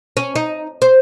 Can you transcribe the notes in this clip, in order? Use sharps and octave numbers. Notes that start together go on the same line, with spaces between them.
C#4
D#4
C5